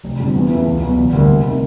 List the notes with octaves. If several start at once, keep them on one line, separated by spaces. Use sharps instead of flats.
F1
F2 D3 G3 C4
E2
C#3 E3 A3
C#2
B2 F#3
E1
D2 D3 G3 A#3
F1
C3 D#3